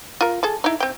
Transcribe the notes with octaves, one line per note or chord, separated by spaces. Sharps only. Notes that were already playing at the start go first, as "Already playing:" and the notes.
F4 A#4
G#4 A4 A5
D#4 E4
C4 G5